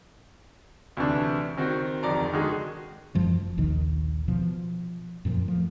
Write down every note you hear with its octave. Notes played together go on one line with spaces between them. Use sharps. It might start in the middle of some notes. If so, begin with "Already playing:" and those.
D2 C3 E3 D4
D#3 C4 F#4
D1 F2 D#3 D5 A#5
D3 D#3 G#3 F#4 G#4
F1 F#2 F3 G#3
A#1 D#2 B2 D#3
B2 F3
F#2 A#2 D3 F3
A2 F3